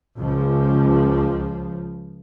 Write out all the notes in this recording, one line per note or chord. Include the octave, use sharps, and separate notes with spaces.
C#2 F3